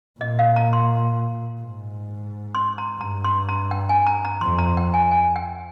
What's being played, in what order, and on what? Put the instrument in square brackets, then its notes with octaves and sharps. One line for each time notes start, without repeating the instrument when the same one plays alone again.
[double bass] A#2 [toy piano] D#5
[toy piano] F5
A#5
C6
[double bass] G#2
[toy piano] C6
A#5
[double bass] G2 [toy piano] A#5
[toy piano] C6
A#5
G5
G#5
A#5
A#5
[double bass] F2 [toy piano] C6
[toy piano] A#5
G5
G#5
G#5
G5